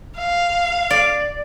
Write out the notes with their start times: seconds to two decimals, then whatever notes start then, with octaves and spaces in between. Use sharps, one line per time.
0.18 F5
0.90 D5